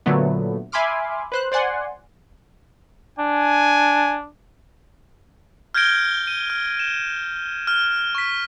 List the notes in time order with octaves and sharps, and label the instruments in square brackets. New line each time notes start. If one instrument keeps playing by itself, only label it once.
[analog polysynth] A#2 D3 F#3 A3 B3
E5 G#5 B5 C6 D6 F6
B4 C5 F#6
C5 D5 F#5 G#5 C6
[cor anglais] D4 [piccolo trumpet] G#5
[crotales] F6 G6 G#6 A#6 D7 G7
D#7
F6
E7
F6
C#6 B6